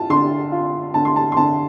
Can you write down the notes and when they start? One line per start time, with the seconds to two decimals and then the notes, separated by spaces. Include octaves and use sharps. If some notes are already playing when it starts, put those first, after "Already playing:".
Already playing: F4 A5
0.10 D3 C6
0.52 F4
0.94 D3 A5
1.05 C6
1.16 A5
1.32 C6
1.37 D3 A5